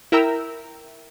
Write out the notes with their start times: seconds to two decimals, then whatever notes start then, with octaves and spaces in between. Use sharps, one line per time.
0.12 E4 A#4 E5 G5 A#5 E6